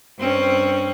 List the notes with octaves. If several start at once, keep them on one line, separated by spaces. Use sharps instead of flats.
G2 C4 C#4